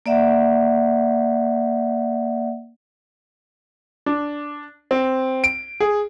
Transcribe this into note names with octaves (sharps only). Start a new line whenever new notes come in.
A#3 D5 E5 F#5
D4
C4
D7
G#4